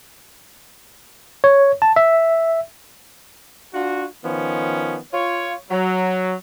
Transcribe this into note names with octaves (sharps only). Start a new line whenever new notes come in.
C#5
A5
E5
D4 F4 F#4
D#3 F3 B3 C#4
F4 C#5
F#3